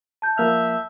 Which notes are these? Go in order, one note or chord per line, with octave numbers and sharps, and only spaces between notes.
A5 G6
F3 A#3 E5 F6